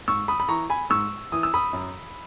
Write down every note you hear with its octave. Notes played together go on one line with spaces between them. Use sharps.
G#2 C#6 E6
B5 D#6
B5
E3 A#5 C#6
G#5 B5
G#2 C#6 E6
E3 D#6
E6
B5 D#6
F#2